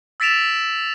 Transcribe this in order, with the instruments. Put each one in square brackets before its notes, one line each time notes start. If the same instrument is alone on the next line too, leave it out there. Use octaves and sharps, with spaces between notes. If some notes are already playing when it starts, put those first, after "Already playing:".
[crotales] E6 A6 B6 D7 E7 F7